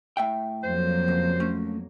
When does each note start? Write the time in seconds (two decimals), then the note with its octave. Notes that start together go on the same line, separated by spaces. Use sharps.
0.17 A2 E5 G5
0.63 F2 F#3 A#3 C5
1.08 C#2
1.40 A3 C#4